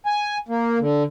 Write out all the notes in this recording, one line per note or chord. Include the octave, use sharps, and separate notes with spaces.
G#5
A#3
D3